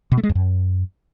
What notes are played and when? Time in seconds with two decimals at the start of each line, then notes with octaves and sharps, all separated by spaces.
0.12 B2
0.17 A3
0.23 G#3
0.29 F2
0.35 F#2